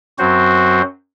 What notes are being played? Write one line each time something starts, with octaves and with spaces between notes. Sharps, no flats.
F#2 F#3 C4 F#4 C5